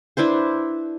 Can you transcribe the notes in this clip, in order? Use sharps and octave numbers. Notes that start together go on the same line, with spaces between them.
D4 E4 B4 C5